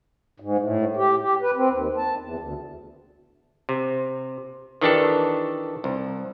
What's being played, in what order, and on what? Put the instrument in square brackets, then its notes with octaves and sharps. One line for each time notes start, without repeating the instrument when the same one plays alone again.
[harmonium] G#2
A2
G4
G4
B4
C4
D#2
A5
E2
D2
[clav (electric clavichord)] C3
D#3 E3 D4 G4 A4
C2